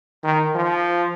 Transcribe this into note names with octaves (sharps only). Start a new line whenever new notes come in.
D#3
F3